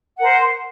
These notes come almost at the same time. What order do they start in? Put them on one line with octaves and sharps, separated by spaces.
F#5 A#4 C5